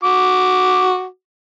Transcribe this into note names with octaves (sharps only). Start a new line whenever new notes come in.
F#4 D6